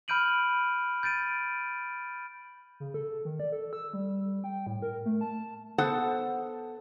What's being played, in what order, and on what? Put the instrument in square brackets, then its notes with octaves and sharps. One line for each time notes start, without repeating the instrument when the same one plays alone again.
[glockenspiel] B5 F6 G6 D7 D#7 F#7
G6 A6 D7 D#7
[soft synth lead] C#3
A4
D#3
D5
A4
E6
G3
G5
A2
A#4
A3
A5
[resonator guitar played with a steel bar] B3 A4 C5 F#5 A5